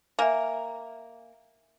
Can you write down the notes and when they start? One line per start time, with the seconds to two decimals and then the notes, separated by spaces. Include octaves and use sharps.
0.19 A#3 E5 G#5